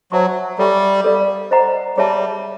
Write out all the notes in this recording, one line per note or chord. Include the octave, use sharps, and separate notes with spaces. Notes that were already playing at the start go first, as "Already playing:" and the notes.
F#3 C5 E5 A5 C#6
G3 A4 C#5 E5 G#5 C#6
A4 D5 F5
C5 D#5 F#5 A#5
G3 G#4 C#5 E5 A5